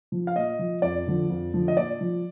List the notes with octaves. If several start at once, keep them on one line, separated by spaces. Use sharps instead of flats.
F3
F5
A#2 D#5
F3
F2 D5
D3 F3
F2
D3 F3
D#5
A#2 D5
F3